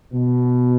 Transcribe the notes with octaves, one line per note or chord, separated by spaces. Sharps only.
B2